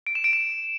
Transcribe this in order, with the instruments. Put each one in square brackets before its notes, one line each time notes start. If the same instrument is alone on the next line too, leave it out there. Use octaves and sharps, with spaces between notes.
[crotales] D7
E7
D7
E7